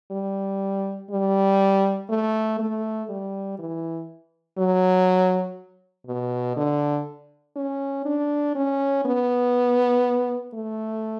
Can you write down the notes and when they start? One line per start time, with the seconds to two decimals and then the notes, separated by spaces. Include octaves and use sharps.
0.11 G3
1.11 G3
2.09 A3
2.59 A3
3.09 G3
3.59 E3
4.58 F#3
6.07 B2
6.56 D3
7.56 C#4
8.05 D4
8.55 C#4
9.05 B3
10.54 A3